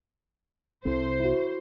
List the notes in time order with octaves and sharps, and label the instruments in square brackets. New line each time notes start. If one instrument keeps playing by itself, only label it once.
[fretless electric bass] C2 C3 C4 [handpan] E4 A4 [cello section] C5
[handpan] E4 F#4